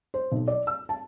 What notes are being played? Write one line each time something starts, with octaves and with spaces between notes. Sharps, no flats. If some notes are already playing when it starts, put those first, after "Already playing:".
C5
B1
D5
E6
A5